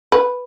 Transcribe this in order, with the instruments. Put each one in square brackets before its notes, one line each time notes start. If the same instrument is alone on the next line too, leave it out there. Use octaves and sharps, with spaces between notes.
[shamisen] B4